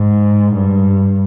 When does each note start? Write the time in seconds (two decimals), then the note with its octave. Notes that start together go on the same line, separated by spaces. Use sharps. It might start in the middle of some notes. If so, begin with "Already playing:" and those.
Already playing: G#2
0.55 G2